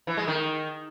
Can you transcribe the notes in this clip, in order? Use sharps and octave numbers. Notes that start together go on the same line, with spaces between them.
E3
G#3
D#3